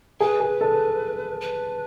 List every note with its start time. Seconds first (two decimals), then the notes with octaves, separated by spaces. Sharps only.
0.20 G#4 B4
0.40 G#4
0.61 A4
1.41 B4